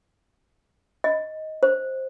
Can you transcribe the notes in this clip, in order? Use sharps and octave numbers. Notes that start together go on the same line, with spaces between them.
D#5
C5